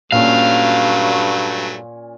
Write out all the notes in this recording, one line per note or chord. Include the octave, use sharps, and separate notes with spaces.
G2 A#2 F#3 A3 C#4 F5